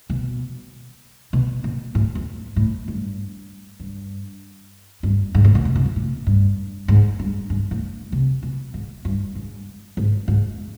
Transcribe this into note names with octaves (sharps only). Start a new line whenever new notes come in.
B2
B2
A#2
A2
E2
A2
G2
G2
G2
G#2
A2
A#2
C3
C3
B2
A2
G2
G#2
G2
G2
A2
C3
B2
G#2
G2
G#2
G#2
G#2